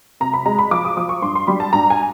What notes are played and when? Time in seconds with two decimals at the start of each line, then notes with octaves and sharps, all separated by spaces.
0.20 C3 A#5
0.33 B5
0.46 G#3 A#5
0.59 B5
0.71 F3 D6
0.85 D#6
0.97 F3 D6
1.09 C#6
1.22 G2 C6
1.35 C6
1.47 G3 B5
1.60 A5
1.73 G2 A#5
1.90 G#5